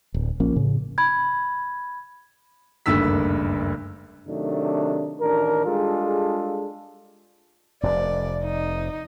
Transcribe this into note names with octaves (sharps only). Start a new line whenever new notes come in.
D1
A#1 F3 A#3 C#4
A2 C#3
B5 G#6
F#1 D2 G2 D#3 E6 B6
C3 D#3 F#3 A3 D4
A1 D#3 D4 A#4
G3 G#3 D4 F4 G#4 A4
F1 F2 C3 D5
D#4